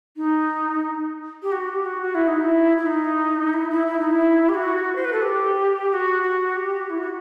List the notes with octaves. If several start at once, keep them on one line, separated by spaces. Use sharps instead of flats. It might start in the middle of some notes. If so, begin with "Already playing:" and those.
D#4
G4
F#4
G4
F#4
F#4
E4
D#4
E4
E4
D#4
E4
E4
E4
D#4
E4
G4
F#4
C5
B4
A4
G4
G4
F#4
F#4
G4
E4
F#4